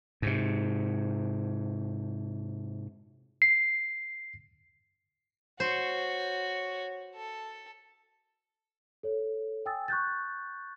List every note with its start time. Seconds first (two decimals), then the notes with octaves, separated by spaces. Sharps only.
0.22 G#2 C3
3.42 C7
5.60 F#4 C5 C#5
7.15 A4
9.03 A4 C#5
9.66 G5 G#5 D#6 E6 A6
9.88 C#6 F#6 G6 A6